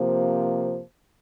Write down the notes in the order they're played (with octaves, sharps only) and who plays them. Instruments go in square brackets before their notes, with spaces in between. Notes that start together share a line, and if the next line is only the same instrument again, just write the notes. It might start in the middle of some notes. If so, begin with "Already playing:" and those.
Already playing: [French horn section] C3 F3 A#3